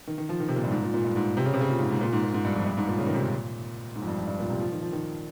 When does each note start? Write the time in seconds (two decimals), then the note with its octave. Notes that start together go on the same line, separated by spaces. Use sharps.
0.07 D#3
0.18 D#3
0.29 F3
0.40 D#3
0.48 C3
0.56 A#2
0.64 G2
0.72 G#2
0.82 A#2
0.94 A#2
1.05 G2
1.16 G#2
1.37 C3
1.45 C#3
1.54 C3
1.61 C#3
1.69 A#2
1.80 G#2
1.91 G#2
2.01 A#2
2.13 G#2
2.23 A#2
2.34 G#2
2.45 G2
2.55 F2
2.66 G2
2.77 G#2
2.87 A#2
2.98 C#3
3.06 D#3
3.14 C3
3.23 A#2
3.96 G#2
4.02 F2
4.07 G2
4.17 F2
4.27 G2
4.39 A#2
4.50 C3
4.61 F3
4.72 D#3
4.82 F3
4.93 D#3